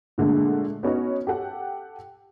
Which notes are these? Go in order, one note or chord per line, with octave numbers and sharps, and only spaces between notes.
A#2 D3 G#3 A3
B3 C#4 D#4 F#4
G4 A4 F#5 G5